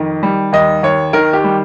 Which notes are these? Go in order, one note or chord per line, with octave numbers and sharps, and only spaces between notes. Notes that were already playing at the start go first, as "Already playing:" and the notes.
Already playing: F2 D#3
G3
D#2 D#5
D#2 C#5
D#3 A#4
G4
G3